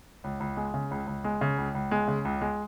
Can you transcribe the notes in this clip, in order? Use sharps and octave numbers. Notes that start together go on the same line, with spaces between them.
C#2
C#2
G#3
C#3
C#2
C#2
G#3
C#3
C#2
C#2
G#3
C#3
C#2
G#3